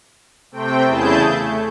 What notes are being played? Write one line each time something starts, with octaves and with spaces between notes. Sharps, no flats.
C3 A3 C4 G5
E2 C#3 E4 G#4 A5 G6
A3